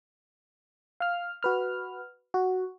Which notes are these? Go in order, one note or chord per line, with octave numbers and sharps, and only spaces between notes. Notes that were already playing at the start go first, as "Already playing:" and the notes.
F5 F6
F#4 B4 F6
F#4